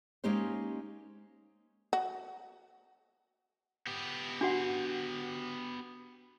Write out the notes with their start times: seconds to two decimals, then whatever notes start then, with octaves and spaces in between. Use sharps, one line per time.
0.24 G#3 A#3 C#4 D#4 G4 C5
1.93 F#4
3.87 B3 G4
4.41 D4 F#4 F#5